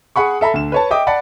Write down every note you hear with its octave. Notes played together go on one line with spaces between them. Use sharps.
G#4 F#5 B5 C#6
A4 E5 A#5 B5
D2 E7
B4 C#5 A5
D#5 E5 G5 D6 D#6
D5 F#5 A5 B5